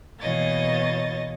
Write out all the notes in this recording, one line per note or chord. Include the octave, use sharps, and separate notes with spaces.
B2 E3 A#3 C#5 D#5 A6